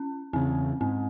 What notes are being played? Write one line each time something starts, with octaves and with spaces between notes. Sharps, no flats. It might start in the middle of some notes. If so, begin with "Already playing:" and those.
Already playing: C#4
E2 C#3 C4
G#2 C4